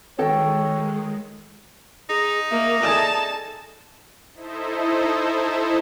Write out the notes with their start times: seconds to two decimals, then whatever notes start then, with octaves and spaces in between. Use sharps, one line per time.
0.19 D#3 G#3 F#4 A4 C#5 G5
2.10 D#4 G#4
2.51 A#3 E5
2.84 G#4 A4 D5 A5
4.34 D#4 E4 A4 C5 D#5 E5